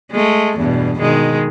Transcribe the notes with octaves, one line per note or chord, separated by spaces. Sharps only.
G#3 A3
E2 G2 B2
B2 D#3 G#3